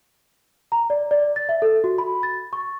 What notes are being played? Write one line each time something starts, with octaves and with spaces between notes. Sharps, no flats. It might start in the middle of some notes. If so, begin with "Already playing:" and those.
A#5
D5
D5
A6
E5
A4
F#4
B5
A6
C#6